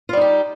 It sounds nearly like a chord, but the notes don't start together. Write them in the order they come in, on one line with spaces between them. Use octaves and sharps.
F4 G3 D#4 G4